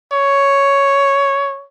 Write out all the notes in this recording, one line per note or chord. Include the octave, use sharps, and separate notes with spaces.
C#5